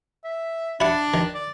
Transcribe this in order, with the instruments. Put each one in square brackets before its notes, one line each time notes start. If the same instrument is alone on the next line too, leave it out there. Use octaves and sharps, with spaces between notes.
[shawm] E5
[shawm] D4 [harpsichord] E4 F#5
[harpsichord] D#3
[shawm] D5